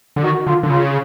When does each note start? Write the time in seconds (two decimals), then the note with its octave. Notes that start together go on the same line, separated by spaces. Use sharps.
0.16 D3
0.23 D#3 F#4
0.47 D3 F4
0.63 D3
0.70 C#3 F4